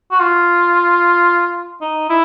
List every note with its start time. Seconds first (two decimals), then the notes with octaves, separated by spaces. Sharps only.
0.11 F#4
0.20 F4
1.81 D#4
2.09 E4